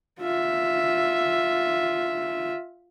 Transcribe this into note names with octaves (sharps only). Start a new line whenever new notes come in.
F4 E5